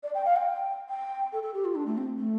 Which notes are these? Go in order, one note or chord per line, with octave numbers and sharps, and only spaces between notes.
D5
G5
F5
G5
G5
A4
A4
G4
F4
D4
A3
C4
A3